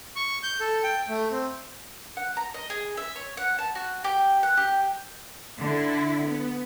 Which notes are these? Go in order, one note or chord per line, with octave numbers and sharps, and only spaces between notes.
C#6
G6
A4
G5
A3
C4
F#5
A#5
D#5
G#4
E5
C#5
F#5
A5
F#4
G4
F#5
G4
D3 E4
B3